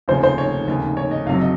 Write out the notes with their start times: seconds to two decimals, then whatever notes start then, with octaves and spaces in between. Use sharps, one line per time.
0.08 F1 D#2 C#3 F3 C5
0.23 C5
0.38 C#5
0.67 F1 D#2 C#3
0.97 C#5
1.11 D#5
1.26 F#1 F2 C3 F#3 F5
1.41 D#5